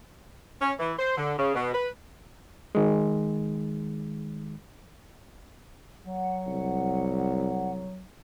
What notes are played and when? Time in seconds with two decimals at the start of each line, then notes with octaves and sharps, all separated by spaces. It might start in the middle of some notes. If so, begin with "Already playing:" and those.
0.61 C#4
0.79 E3
0.99 C5
1.17 D3
1.38 C#3
1.55 B2
1.74 B4
2.75 D#3 G#3
6.05 F#3 F#5
6.47 C2